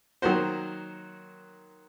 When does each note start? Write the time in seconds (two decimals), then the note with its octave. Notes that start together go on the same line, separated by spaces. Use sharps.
0.22 D#3 F#3 A#3 F#4 C5